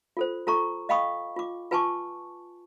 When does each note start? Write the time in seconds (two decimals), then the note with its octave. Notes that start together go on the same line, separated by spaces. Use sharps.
0.17 F4 A4 C5
0.47 F4 A4 A#5 C#6
0.89 D#5 F5 G5 B5 C#6 D#6
1.36 F4 D6
1.71 F4 B4 G#5 A5 C#6 D6